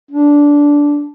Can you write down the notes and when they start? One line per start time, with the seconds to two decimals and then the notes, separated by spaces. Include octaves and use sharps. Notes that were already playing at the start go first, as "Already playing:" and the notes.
0.11 D4